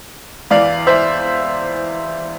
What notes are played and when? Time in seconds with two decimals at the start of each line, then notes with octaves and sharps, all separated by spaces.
0.51 E2 E3 D5 F5
0.87 C5 E5